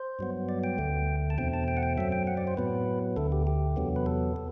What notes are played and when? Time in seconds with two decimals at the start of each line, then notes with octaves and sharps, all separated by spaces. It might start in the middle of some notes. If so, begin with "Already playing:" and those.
Already playing: C5
0.19 G2 F#3 B3
0.49 D5
0.64 G5
0.78 D2 D3 A3
1.30 A5
1.38 E2 B2 A3 C4 G5
1.54 A5
1.68 G5
1.77 F#5
1.83 G5
1.98 F#2 F#3 C4 E5
2.12 G5
2.27 F#5
2.37 D5
2.47 C5
2.57 A2 F#3 B3 B4
3.16 D2 D3 A3 A4
3.32 G4
3.47 G4
3.76 E2 C3 F#3 B3
3.96 B4
4.06 A4
4.36 C3